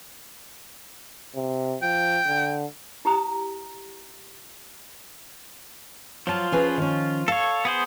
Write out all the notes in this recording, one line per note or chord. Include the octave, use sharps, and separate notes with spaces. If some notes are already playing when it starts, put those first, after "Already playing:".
C3
F3 G5
D3
E4 G4 A#5 D#6
F3 F#3 F4 A5
C#4 G#4 B4
D#3 C#4
A4 C#5 F5
B3 G#4 C5